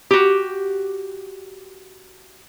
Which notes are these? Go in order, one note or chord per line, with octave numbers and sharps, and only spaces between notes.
F#4 G4